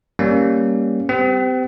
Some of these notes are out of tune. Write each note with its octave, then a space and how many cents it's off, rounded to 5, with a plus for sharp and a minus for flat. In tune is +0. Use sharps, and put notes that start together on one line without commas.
G3 +0 A#3 +5 C#4 +0
C4 -35 G4 +0